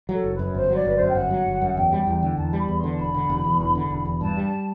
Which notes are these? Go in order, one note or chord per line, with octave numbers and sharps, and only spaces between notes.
F#3
A4
F#1
B4
F#2
G1 C5
F#3
D5
G1 B4
F#2 C5
G5
G1 F#5
F#3
G1
F#2
E2 G5
G3
E2
D3
E2 A5
G3 B5
E2
D3 C6
A5
E1 B5
D3
E1
E2
E1
D3
E1
E2
G2 A5
G3